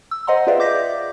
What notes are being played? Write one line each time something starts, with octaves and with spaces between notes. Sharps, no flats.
E6
C5 D#5 F#5 A#5 C6
F4 G#4 B4 D5 E5 F5
D6 G6 A#6 B6
D5